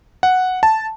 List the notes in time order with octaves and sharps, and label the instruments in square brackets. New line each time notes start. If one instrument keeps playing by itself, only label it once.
[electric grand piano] F#5
A5